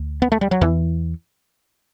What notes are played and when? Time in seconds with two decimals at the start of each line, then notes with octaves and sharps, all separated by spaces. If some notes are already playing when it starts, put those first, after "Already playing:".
Already playing: D2
0.22 B3
0.32 A3
0.41 G3
0.51 F#3
0.61 E2 E3